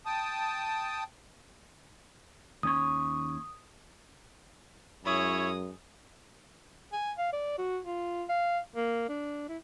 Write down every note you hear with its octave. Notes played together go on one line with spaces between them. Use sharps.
G5 A5 D#6
D#2 C#4 C#5 D#6
F#2 G#3 E4 C#5 D#6
G#5
F5
D5
F#4
F4
F5
A#3
D4
E4